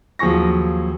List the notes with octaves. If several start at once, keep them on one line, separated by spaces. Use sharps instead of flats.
D#2 F3 F#3 G#4 C#6 A#6